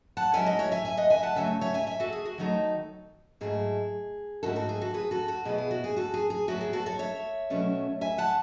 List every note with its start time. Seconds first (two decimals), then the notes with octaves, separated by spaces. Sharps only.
0.17 F#5 A5
0.33 G#2 F#3 C#4 E4 E5 G#5
0.46 D#5 F#5
0.59 C#5 E5
0.72 E5 G#5
0.85 E5 G#5
0.97 D#5 F#5
1.10 E5 G#5
1.23 F#5 A5
1.36 C#3 F#3 A3 E5 G#5
1.61 C#5 E5
1.74 E5 G#5
1.87 E5 G#5
2.00 F#4 A4
2.13 G#4
2.25 F#4
2.38 D#3 F#3 A3 D#4
3.41 G#2 F#3 A3 E4 G#4
4.43 G#2 D#3 A3 C#4 E4 F#4 A4
4.56 F#4 A4
4.69 G#4
4.81 F#4 A4
4.94 G#4 B4
5.11 F#4 A4
5.28 F#4
5.45 B2 F#3 B3 E4 G#4
5.58 G#4
5.71 F#4
5.84 G#4
5.96 F#4 A4
6.14 G#4
6.30 G#4
6.48 A2 F#3 B3 E4 F#4
6.61 G#4
6.73 F#4 A4
6.86 A4 C#5
6.99 C#5 E5
7.50 B2 F#3 A3 C#4
8.01 E5 G#5
8.18 F#5 A5